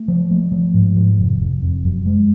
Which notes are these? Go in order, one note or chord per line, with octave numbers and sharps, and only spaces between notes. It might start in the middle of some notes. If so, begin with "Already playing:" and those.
Already playing: A3
F3
A3
F3
G#2
F3
F1
F1
F2
F#2
G#3